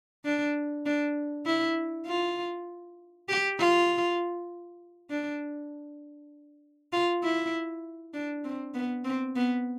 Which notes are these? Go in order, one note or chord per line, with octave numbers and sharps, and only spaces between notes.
D4
D4
E4
F4
G4
F4
D4
F4
E4
D4
C4
B3
C4
B3